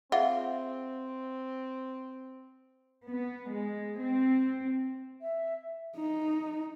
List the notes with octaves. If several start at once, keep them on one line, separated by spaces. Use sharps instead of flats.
C4 F4 G#4 E5 F#5
B3
G#3
C4
E5
D#4